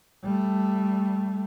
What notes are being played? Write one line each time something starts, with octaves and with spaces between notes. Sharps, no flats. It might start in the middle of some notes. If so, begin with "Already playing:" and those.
G3 A3